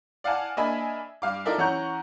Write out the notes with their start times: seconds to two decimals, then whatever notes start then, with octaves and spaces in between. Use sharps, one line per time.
0.24 D5 F5 F#5 G#5 A5
0.57 A#3 D4 D#5 E5 G#5 B5
1.22 G2 F5 D6
1.45 D#4 F4 A4 A#4 D5 E5
1.58 E3 C#4 F#5 A#5 C#6 G6